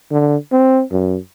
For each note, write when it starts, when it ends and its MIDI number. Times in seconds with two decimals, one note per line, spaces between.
0.11 0.36 50
0.52 0.82 60
0.91 1.17 42